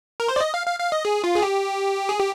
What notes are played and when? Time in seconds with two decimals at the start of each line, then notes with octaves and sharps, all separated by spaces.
0.20 A#4
0.28 C5
0.36 D5
0.40 D#5
0.54 F5
0.67 F5
0.80 F5
0.92 D#5
1.05 G#4
1.24 F4
1.35 G#4
1.42 G4
2.09 G#4
2.19 G4